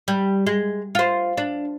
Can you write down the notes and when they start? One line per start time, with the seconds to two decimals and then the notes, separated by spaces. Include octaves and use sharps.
0.08 G3
0.47 G#3
0.95 F4 C5
1.37 D4